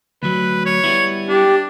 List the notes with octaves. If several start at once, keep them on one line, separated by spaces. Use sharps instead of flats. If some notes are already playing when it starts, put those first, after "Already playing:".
D2 F#3 B4
C#5
G3 B3 E4
D4 G4